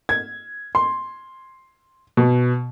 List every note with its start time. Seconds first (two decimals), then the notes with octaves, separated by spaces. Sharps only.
0.09 G#6
0.75 C6
2.17 B2